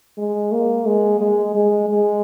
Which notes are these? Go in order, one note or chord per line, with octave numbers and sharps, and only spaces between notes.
G#3
A#3
G#3
G#3
G#3
G#3